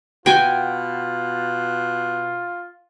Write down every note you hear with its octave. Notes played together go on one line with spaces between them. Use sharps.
B2 F4 F#4 G5 G#5